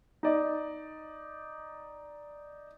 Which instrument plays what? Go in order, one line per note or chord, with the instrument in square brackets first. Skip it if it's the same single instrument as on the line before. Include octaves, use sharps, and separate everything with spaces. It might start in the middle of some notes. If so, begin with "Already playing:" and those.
[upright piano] D#4 D5 D#5